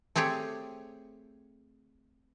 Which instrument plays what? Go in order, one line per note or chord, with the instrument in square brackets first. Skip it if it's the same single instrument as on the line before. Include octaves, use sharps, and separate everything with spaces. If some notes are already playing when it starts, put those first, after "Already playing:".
[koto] A3 C4 G4 G#4 C#5